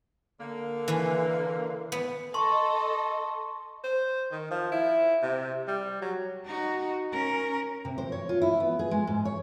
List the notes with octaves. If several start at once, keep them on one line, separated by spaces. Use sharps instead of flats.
D3 A#3
E3 E4
B3
A4 D#5 A5 C6 C#6
C5
D#3
F3
E4
C3
G3
F#3
D#4 F#4
C#4 A#4
C3
C5
C#5
F4
E4
B3
G#4
G#3
G#2
C#5